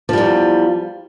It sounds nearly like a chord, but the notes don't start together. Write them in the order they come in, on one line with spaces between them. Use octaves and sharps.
F3 G3 E2